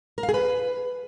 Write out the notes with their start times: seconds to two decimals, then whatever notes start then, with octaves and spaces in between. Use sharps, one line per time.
0.18 A#4
0.23 F5
0.29 G#4
0.34 B4